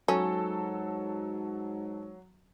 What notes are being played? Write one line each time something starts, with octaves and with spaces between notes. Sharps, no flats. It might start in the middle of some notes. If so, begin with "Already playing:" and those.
G#2 F#3 C#4 A4